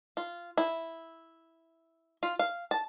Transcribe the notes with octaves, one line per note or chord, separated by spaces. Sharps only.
F4
E4
F4
F5
A5